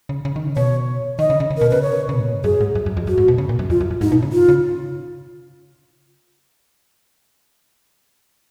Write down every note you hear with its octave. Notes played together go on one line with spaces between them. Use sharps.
C#3
C#3
D#3
C#3
B2 C#5
D#3 D#5
C#3
C#3
C#3
B2 A#4
C#3 B4
C#5
C#3
B2
G#2
A#2
G#2
F#2 G#4
G#2
F#2
F#2
F2
F#2 F#4
G#2
B2
C#3
A#2
F#2
F2 F4
F#2
F#2
G#2 D#4
B2
C#3
F4
C#3